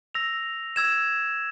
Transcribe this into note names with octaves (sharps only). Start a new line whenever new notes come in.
E6 A#6 F7
E6 G#6 E7